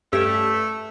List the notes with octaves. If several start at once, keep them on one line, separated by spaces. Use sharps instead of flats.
G2 A3 C#4 G4 E6